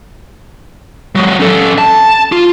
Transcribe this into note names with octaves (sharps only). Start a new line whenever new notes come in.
F#3 G#3
C#4 A4
A5
F4